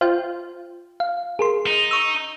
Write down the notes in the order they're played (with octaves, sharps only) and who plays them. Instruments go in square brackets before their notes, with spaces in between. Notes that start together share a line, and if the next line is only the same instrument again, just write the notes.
[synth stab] F4 [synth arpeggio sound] C5 G5
[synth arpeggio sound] F5
G#4 A#4 C6
[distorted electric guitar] D#4
[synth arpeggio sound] C#6 E6